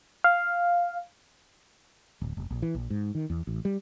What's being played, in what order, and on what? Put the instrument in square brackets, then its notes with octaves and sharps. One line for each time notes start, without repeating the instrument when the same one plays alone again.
[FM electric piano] F5
[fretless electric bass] D1
F1
A#1
E3
A#1
G#2
D#3
E2
A1
G3